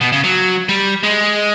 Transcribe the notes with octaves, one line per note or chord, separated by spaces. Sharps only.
B2
C#3
F#3
G3
G#3